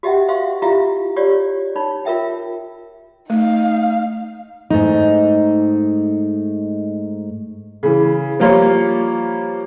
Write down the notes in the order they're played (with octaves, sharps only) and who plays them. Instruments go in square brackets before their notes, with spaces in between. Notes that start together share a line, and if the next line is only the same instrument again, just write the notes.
[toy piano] F#4 G4 D#5 E5 F#5 G5
C5 E5 F5 C6 C#6
E4 F4 G4 E5 F5 A#5
F4 G4 C#5 D5
D#4 C#5 B5
F4 A#4 E5 G5
[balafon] A3 [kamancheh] D#4 F5
[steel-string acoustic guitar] G#2 A3 D#4
[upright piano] C#3 E3
F3 G3 A#3 F4 C#5